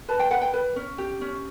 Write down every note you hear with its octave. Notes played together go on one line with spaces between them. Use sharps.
B4 A5
G5
B4 F#5
G5
B4
C#4
G4
C#4